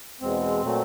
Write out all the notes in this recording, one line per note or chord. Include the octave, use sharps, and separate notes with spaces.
E2 B2 G#3 C4
A#2 F#3 A3